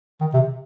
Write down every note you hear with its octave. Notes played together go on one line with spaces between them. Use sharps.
D#3
C3